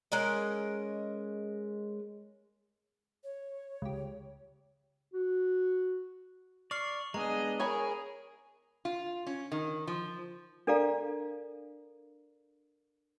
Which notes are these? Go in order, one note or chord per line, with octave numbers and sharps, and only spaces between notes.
G#3 C#4 A#4 D#5
C#5
C#2 G4
F#4
D5 C#6 F6 C7
G#3 B3 D4 G#4 D#5 A#5
G#4 A#4 C#5 G#5 B5
F4
C#4
D#3
F3
D4 A4 A#4 D5 F5 A#5